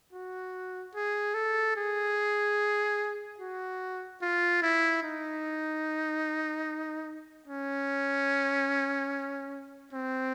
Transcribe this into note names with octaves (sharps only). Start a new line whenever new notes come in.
F#4
G#4
A4
G#4
F#4
F4
E4
D#4
C#4
C4